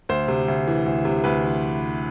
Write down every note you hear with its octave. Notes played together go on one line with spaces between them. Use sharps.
D2 C5
C3
D2
E3
D2
C3
D2 B4
E3